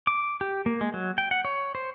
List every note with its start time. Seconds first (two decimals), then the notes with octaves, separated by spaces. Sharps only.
0.07 D6
0.41 G4
0.66 A#3
0.81 G#3
0.94 F#3
1.18 G5
1.31 F#5
1.45 C#5
1.75 C5